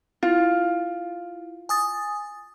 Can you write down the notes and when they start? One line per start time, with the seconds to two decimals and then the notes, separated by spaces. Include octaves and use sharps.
0.23 E4 F4
1.69 G#5 D#6 A6